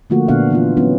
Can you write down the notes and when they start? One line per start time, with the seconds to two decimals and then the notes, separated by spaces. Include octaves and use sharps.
0.10 D3 F3 A3 A#3 F4 F#4
0.28 A#2 D3 B3 D4 F5 F#5
0.50 E3 B3 F4
0.77 F#3 B3 C#4 E4